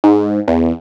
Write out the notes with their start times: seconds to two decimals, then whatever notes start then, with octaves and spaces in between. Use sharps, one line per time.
0.04 G#2
0.48 E2